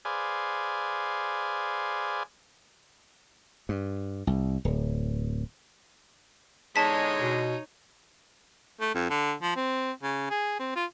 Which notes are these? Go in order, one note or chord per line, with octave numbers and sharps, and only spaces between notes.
G#4 B4 C5 D5 F5 G#5
G2
C2
D1
E2 D3 G#3 D#4 C#5 A5 B6
B2
A3
F2
D3
F3
C4
C#3
G#4
C4
F4